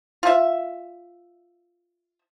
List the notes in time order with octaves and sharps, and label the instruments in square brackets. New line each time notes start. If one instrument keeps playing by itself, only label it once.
[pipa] F4 E5